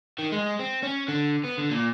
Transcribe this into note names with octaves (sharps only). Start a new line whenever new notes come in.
D#3
G#3
C4
C#4
D3
B3
D3
A#2